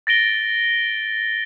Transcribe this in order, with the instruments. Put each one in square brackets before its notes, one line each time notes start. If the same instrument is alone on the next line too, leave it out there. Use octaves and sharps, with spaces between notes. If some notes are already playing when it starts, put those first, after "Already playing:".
[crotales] A6 A#6 D7 G7